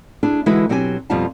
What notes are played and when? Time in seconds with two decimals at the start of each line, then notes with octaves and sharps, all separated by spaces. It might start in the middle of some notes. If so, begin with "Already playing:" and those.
0.23 D4 E4 G#4
0.46 D3 E3 G#3 E4 F#4 B4
0.69 B2 F#3 C4 G4 D5 G#5
1.10 F2 B2 G3 F4 F5 A5